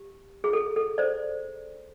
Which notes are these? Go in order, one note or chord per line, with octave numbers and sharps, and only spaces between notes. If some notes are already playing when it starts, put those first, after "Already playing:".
Already playing: G4
G#4
A4
A4
C5 D5